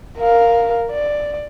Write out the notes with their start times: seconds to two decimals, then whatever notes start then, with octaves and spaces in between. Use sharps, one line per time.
0.19 A#4 F5
0.91 D5